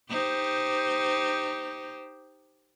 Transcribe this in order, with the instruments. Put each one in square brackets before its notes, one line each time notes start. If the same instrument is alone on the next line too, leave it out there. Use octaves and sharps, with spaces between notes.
[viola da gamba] D#4 G4 C5